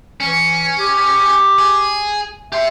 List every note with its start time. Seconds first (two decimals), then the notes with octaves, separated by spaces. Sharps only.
0.20 E3 C#4
0.79 G4
1.59 G#4
2.52 G4 E5 C6